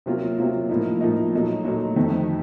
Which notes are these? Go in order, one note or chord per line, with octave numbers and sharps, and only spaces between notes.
C3 F#3 A#3 F4
C3 F#3 A#3 F4
A2 F3 A#3 D#4
A2 F3 A#3 D#4
A#2 F#3 A3 D#4
A#2 F#3 A3 D#4
F2 D#3 A3 D#4